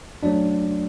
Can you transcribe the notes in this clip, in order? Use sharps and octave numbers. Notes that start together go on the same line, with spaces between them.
F#2 F#3 A3 D4 D5